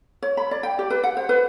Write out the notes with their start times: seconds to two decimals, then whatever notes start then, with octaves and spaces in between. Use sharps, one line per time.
0.22 C#5
0.37 B5
0.51 D5
0.63 G5
0.79 G4
0.90 B4
1.03 F#5
1.17 C5
1.29 B4